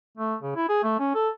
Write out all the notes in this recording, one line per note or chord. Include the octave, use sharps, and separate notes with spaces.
A3
C#3
E4
G#4
A3
C#4
A4